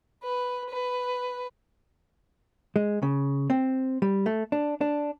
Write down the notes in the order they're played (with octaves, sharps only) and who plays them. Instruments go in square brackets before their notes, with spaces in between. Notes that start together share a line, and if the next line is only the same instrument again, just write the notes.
[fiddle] B4
B4
[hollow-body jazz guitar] G#3
C#3
C4
G3
A3
D4
D4